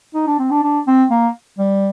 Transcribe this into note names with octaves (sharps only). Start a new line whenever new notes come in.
D#4
D4
C4
D4
D4
C4
A#3
G3